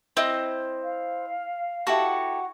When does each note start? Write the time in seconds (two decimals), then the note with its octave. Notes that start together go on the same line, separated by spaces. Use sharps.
0.17 C4 E4 D#5 D#6
0.83 F5
1.87 E4 F#4 G4 A4